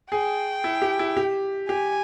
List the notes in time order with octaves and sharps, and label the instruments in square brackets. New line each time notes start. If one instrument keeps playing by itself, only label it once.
[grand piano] G#4 [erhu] G5
[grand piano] E4
G4
E4
G4
[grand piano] G4 [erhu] G#5